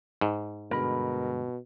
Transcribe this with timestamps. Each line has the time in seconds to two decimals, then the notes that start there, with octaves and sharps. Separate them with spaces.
0.21 G#2
0.71 G2 B2 D3 G#3 A#4 B5